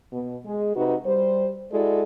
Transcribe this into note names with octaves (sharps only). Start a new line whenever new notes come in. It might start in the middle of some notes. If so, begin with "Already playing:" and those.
B2
G#3
C3 D#4 F#4 B4
G3 C5
G#3 E4 F#4 A4 D5